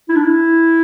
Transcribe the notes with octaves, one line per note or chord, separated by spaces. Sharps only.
E4
D4
E4